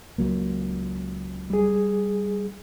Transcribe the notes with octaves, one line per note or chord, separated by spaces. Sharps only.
C#2 F#3 A#3
G3 G#4